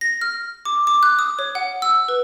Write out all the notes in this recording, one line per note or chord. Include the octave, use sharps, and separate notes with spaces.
A#6
F6
D6
D6
F#6
D#6
C#5
F#5
E6
B4